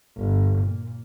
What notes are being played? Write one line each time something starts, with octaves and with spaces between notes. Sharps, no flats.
G1
A#2